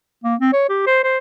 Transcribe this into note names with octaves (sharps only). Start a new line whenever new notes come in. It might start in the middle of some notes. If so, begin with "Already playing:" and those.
A#3
C4
C#5
G4
C5
C5